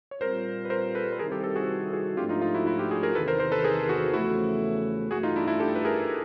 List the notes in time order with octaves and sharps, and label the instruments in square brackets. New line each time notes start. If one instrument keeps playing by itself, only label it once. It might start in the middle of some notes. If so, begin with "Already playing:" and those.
[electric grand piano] C#5
[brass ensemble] A#2 G3 C4 F4 [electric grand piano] A#4 C5
[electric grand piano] B4
A#4 C5
A4 B4
B4
[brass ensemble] C3 D#3 G3 C4 E4 [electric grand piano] G#4 A#4
[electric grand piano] G4 A4
G4 A4
F#4 G#4
F#4 G#4
[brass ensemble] G#2 F3 A3 D4 [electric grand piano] F4 G4
[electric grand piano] D#4 F4
D#4 F4
E4 F#4
E4 F#4
F4 G4
F#4 G#4
G#4 A#4
[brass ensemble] E2 C3 D#3 [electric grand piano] A4 B4
[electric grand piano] A#4 C5
A#4 C5
A4 B4
G#4 A#4
F#4 G#4
[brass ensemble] E2 C#3 F3 A3 [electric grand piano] E4 F#4
[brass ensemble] G2 E3 A3 [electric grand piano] F#4 G#4
[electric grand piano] D#4 F4
D4 E4
D4 E4
G4 A4
B4
G#4 A#4